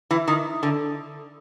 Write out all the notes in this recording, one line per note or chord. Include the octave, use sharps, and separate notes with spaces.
E3
D#3
D3